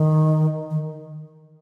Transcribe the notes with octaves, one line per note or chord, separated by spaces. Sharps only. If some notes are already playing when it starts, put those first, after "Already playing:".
Already playing: D#3
D#3